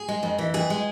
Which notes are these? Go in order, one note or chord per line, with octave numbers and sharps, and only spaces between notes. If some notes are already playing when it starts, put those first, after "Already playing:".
Already playing: G#4
G#3
F2
E3
F2 G#4
G#3